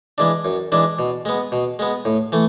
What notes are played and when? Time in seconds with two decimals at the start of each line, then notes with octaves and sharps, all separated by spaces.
0.18 E3 G#3 D4
0.45 F#2
0.72 E3 G#3 D4
0.99 B2
1.25 G#3 B3
1.52 B2
1.79 G#3 B3
2.05 A2
2.32 E3 A3